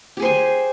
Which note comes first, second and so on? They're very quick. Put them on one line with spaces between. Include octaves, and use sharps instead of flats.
G4 G#4 C5 G#5